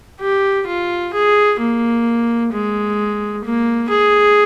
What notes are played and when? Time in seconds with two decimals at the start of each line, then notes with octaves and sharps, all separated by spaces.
0.20 G4
0.67 F4
1.13 G#4
1.60 A#3
2.52 G#3
3.44 A#3
3.89 G#4